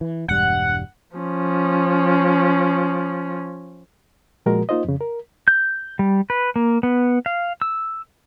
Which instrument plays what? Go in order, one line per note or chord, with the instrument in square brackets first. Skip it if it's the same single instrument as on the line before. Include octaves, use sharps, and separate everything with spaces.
[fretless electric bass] E3
[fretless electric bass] E1 G2 G3 [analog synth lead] F#5
[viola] F3 C#4
[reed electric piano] A#2 F3 G#3 F#4 A#4
A#3 D#4 F4 C5 D#5
F2 C#3
A#4
[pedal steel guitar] G6
G3
B4
A#3
B3
F5
E6